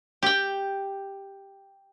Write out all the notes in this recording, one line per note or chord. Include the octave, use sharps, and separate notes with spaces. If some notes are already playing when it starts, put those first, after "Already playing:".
G4 G5